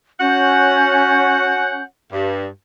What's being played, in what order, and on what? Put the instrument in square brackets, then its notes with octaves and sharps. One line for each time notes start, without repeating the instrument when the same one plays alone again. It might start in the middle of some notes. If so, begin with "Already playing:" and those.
[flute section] C#4 G6 [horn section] F#4 C#5 F#5
[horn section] G2